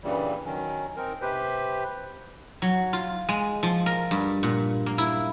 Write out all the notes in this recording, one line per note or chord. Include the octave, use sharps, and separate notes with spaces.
G2 A#2 C#3 E3 G3
D#3 F#3 C#4
C4 D#4 A#4
C3 G4 B4 C5
F#3
F4
G#3
F3
A#4
G2
A#2
A#3
E4